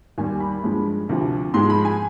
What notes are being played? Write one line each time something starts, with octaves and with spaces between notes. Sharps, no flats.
D#2 D#3 G3 G#5
B5
G2 F3 G#3
D2 C3 F3
G#2 F3 G#3 C6
B5
G#5